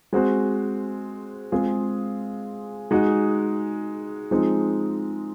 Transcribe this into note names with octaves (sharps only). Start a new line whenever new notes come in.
G#3 C4 F#4 C5
G#3 C4 F4 G#4
G#3 D#4 F#4
F3 G#3 C4 D#4